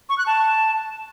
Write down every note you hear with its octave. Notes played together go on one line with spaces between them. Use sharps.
C#6
F#6
A5